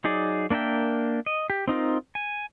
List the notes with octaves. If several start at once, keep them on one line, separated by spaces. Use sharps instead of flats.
F#3 D#4 G#4 D5
A#3 D4 A#4 E5 G5
D#5
G4
C4 D#4 F4 A#4
G#5